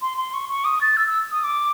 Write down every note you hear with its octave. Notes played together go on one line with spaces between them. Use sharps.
C6
C6
C#6
C#6
D#6
A6
E6
E6
D#6
D6